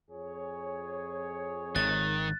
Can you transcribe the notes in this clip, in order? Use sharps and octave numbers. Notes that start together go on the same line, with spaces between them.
F2 G#4 C#5
G#1 D#3 F#6 A6